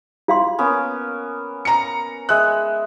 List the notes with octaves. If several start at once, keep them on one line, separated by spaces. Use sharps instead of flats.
F4 F5 C6
A#3 B3 C#4
A#5 C#7
G#3 E5 F#6